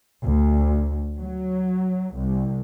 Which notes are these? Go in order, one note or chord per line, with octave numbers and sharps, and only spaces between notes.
D2
F#3
C2